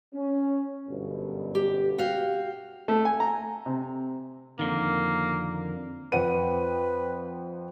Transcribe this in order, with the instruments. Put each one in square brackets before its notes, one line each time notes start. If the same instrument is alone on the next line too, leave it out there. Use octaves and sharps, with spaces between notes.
[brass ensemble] C#4
G1 F#2 B2
[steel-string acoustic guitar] G4
F#4 G4 F5
[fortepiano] A3
G#5
A#5
C3
[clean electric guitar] F2 D3 D#3 [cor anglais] A#3
[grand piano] F2 F#5 D#7 [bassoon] B4